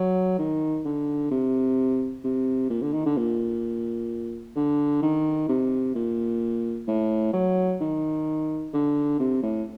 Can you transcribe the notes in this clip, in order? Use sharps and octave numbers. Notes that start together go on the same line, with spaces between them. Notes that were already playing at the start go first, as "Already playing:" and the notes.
Already playing: F#3
D#3
D3
C3
C3
A#2
D3
D#3
D3
A#2
D3
D#3
C3
A#2
A2
F#3
D#3
D3
C3
A2